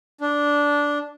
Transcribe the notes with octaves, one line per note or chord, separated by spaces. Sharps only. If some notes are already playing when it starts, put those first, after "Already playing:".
D4